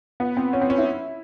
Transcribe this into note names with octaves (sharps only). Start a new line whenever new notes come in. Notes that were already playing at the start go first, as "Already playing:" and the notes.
B3
C4
C#4
C4
C#4
E4